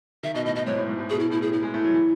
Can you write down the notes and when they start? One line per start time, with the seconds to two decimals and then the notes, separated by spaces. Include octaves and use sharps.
0.23 D#3 E5
0.35 B2 D#5
0.45 A2 D#5
0.55 A2 D#5
0.66 G#2 C#5
0.77 A2
0.88 G#2
0.99 A2
1.09 B2 G#4
1.19 B2 E4
1.30 A2 E4
1.41 A2 G#4
1.52 A2 E4
1.62 G#3
1.74 A3
1.84 F#3
1.94 E3